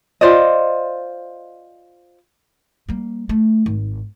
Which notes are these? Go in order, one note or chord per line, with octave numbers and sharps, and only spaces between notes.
F4 C5 D5 D#5
G3 A#3
A3
G#1